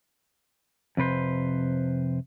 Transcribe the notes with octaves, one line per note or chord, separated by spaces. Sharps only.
F2 C3 B4 C5